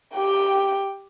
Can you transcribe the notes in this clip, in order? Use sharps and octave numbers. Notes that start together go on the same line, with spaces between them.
G4 G5